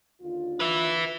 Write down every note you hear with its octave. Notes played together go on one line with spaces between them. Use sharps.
D#2 D3 F4
B4 E5